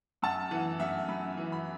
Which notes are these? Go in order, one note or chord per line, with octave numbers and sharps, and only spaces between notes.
F#2 A5
E3 F#5
F#2 E5
F#2 B5
E3
B5